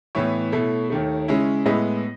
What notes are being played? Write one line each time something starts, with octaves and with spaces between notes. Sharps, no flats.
A2 E3 B3 E4 C#5
B2 A3 E4
D#2 D#3 A3
C#3 G#3 C#4 E4
A2 G#3 B3 E4 D#5